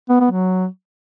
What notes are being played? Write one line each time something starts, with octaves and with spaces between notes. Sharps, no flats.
B3
B3
F#3